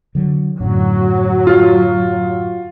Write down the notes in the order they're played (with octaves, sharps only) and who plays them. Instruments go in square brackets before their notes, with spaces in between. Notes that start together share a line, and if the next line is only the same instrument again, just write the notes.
[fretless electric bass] D3 F#3
[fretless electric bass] F#2 A2 D3 [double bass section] F#3
[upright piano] F4